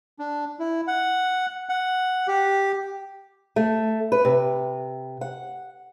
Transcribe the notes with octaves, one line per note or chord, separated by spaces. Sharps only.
D4
E4
F#5
F#5
G4
A3
B4
C3
F#5